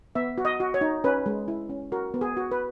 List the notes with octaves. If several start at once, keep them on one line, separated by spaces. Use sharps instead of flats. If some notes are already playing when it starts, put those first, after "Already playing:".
B3 E5
F#4
D#5
F#4
C#5
D#4
C#4 B4
G#3
E4
C#4
F#4 A#4
B3
G#4
F#4
B4